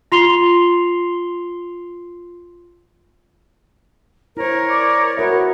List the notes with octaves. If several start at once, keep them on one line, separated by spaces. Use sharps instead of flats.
F4 C6 C7 F7 G7
E4 A#4 C5 C#5
D5
B3 F#4 A#4 C#5 E5